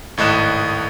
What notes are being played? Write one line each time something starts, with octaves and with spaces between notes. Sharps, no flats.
G#1 A2 D#5 F#6 E7